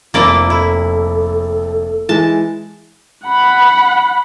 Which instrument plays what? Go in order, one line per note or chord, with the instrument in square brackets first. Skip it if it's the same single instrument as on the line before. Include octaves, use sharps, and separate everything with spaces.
[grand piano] F1 F2 E6 [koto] A#3 E4 D5 [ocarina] F4
[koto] E4 [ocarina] A4
[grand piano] E3 G#3 [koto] A5
[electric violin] F#5 B5